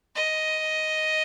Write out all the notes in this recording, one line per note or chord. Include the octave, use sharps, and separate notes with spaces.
D#5